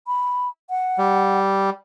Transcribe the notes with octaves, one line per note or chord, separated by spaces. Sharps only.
B5
F#5
G3